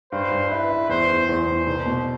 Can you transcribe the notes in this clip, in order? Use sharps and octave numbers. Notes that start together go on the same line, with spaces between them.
G2 C5
G2
E4 B4
E4
E2 C5
E2
E2 C5
E2
C2
B2